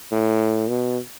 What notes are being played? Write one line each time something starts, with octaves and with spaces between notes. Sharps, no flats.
A2
B2